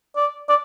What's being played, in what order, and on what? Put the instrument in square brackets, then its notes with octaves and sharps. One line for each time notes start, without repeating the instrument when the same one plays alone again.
[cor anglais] D5
D5